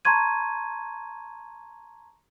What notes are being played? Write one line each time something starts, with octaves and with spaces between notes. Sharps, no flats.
A5 A#5 C6 C#6 G#6 D#7